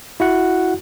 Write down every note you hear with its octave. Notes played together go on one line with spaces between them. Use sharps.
E4 F#4 F#5